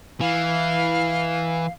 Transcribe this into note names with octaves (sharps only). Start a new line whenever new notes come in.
E3 F5